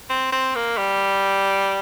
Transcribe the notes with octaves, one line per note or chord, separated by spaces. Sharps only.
C4
C4
A#3
G3